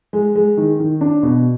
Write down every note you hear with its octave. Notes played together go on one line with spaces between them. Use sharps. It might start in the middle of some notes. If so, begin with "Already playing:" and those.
G#3
G#3
D#3
D#3
D4
B2